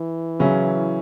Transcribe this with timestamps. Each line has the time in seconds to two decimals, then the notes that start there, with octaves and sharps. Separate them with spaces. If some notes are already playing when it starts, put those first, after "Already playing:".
Already playing: E3
0.39 C#3 F#3 C#4 E4